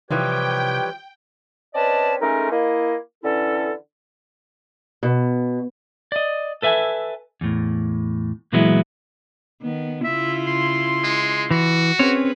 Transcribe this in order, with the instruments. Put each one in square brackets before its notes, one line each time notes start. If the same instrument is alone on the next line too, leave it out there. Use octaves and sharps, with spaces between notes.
[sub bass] C3 [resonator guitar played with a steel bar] E3 F3 G3 [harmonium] G4 B4 C#5 [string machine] G5
[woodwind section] C4 C#4 B4 D5 D#5 A5
G#3 A3 C#4 D#4 A4 A#4
A#3 E4 D#5
D3 E3 C#4 E4 A4
[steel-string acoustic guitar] B2
[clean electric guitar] D5 D#5
A4 B4 E5 F5 G#5
E2 A2
A#2 E3 F#3 G#3 B3 E4
[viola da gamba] D#3 B3
[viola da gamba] C#3 E4 F4 [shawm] E5
[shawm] C6
[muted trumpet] G#3
[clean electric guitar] E3 [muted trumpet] F#4
[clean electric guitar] C4 C#4 C#5 [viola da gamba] G#4 B4